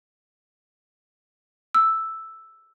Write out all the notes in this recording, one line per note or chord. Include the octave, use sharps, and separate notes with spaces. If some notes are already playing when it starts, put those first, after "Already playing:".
E6